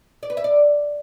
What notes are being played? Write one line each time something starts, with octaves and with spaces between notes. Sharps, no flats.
D5
B4
E5
D5